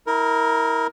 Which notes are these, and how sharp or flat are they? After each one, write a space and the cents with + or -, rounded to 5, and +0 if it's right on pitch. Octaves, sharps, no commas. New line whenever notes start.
E4 -35 A#4 +0